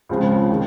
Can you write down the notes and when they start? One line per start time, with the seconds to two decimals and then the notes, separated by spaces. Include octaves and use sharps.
0.09 C#2 C#3 F3 C4
0.51 D#3 G#3